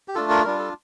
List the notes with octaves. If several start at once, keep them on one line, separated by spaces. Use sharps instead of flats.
G4
A3 D4 F4 A4
A#4
G3 D4 F4 A#4
A4